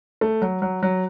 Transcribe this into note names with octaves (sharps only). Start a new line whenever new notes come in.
A3
F#3
F#3
F#3